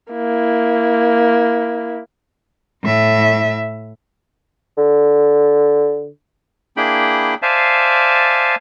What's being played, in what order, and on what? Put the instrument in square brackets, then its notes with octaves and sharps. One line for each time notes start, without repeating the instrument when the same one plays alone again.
[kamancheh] A#3 E4
[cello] A2 E5
[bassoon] D3
[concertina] A#3 D4 E4 G#4 G5 B5
C5 D5 E5 F5 G#5 A5